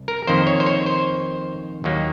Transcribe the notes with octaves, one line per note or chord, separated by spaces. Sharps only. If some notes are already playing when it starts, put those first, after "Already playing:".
Already playing: C2
A#4
F2 D#3 A#3 C5
C#5
C5
C#5
C5
D#2 D#3 F#3 A#3